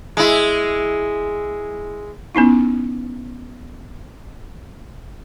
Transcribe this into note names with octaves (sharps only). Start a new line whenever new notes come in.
G#3 E4
B3 C#4 D#4 E4